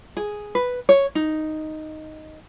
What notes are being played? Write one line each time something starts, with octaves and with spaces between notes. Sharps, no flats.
G#4
B4
C#5
D#4